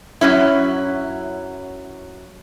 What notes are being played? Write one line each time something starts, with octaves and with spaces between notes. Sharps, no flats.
F#2 F#3 C#4 E4